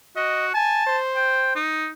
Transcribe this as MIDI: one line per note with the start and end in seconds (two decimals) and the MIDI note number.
0.16 0.51 66
0.16 0.47 75
0.54 0.83 80
0.54 0.97 81
0.87 1.57 72
1.16 1.55 79
1.55 1.90 63